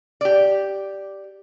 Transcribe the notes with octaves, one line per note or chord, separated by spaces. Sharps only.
G4 D5